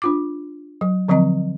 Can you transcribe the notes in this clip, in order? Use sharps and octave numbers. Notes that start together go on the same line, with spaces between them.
D4 F4 D6
F#3
D3 F3 F#3 C4 D#5